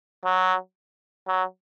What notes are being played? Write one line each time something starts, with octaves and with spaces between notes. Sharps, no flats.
F#3
F#3